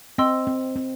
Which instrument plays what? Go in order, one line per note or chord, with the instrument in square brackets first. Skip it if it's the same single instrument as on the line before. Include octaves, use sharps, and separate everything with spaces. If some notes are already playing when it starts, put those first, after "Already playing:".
[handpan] C4 [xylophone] D#5 G5 C6 E6
[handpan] C4
C4